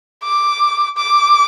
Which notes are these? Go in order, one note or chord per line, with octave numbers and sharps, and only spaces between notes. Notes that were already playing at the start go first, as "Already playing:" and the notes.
D6
D6